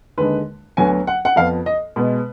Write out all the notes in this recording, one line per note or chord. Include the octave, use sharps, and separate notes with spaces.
D#2 D3 G#3 B4
D2 D3 F#3 B3 G#5
F#5
F#5
F2 F3 B3 F5
D#5
B2 G#3 B3 B4